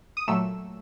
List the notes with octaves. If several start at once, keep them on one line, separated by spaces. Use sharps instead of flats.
D#6
A#2 F#3 A3 E6